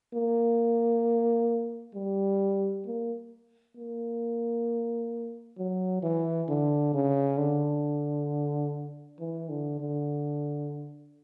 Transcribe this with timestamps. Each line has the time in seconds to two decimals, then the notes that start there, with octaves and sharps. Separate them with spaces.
0.14 A#3
1.95 G3
2.86 A#3
3.77 A#3
5.58 F#3
6.02 E3
6.48 D3
6.94 C#3
7.38 D3
9.20 E3
9.49 D3
9.80 D3